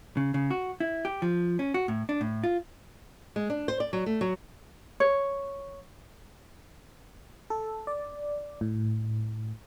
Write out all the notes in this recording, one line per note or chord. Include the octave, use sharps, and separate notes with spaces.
C#3
C#3
F#4
E4
G4
F3
C#4
F#4
A2
D4
A2
F4
G#3
D4
C5
D5
F#3
A3
F#3
C#5
A4
D5
A2